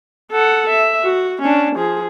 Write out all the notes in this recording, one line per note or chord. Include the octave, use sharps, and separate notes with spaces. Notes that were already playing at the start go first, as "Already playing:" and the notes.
A4 F#5
E5
F#4
C#4 D4
F3 G#4